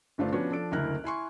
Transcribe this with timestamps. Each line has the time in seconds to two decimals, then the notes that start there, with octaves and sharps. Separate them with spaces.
0.18 G1 G2 A3 D4 F4 C5
0.32 F3 B3 C#4 D4 F#4 C#5
0.50 F3 D4 A4 D7
0.72 F#1 D2 E4 A#4 F6 F#6
1.04 E4 G#5 C6 C#6